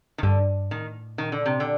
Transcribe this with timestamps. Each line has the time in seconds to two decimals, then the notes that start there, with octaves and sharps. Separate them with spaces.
0.18 D#3
0.23 G2 D3
0.71 A2 D#3
1.18 A#2 D#3
1.32 D3
1.46 C3
1.60 D3